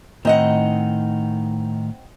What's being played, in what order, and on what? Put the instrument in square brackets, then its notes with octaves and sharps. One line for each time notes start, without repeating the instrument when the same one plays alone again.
[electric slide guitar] A2 D#3 D#4 [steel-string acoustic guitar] C4 D#5 F#5